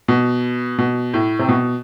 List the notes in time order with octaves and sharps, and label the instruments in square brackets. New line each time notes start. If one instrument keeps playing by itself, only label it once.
[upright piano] B2
B2
A2
C3
B2